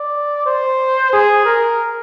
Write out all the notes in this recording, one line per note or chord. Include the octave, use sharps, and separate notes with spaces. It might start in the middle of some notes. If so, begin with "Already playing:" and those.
Already playing: D5
C5
G#4
A#4